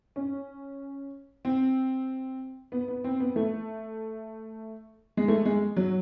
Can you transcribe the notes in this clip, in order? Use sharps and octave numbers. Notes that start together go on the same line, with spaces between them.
C#4
C4
B3
B3
C4
B3
A3
G#3
A3
G#3
F#3